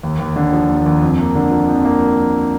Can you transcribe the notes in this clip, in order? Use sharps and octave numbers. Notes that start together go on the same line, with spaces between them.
D#2
D#2
D3
F3
D#2
D#2
F2
A#3
D3
F3
F2
A#3